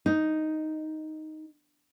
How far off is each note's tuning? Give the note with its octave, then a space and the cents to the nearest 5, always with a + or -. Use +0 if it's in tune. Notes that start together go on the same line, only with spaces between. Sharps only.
D#4 +0